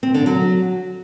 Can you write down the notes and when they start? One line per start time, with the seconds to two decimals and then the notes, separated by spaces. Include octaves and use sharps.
0.03 C4
0.14 D3
0.26 F#3